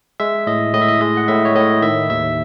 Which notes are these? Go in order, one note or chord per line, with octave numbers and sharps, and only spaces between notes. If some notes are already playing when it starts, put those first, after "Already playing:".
G#3 E5
A2 D#5
A2 D#5
E5
D#5
G#3 D#5
F#5
A2 E5
C#5
A2 D#5
D#3 E5
D#2 E5